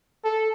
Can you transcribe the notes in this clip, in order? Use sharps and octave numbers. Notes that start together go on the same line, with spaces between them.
A4